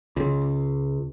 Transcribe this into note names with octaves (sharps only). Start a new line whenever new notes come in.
C#2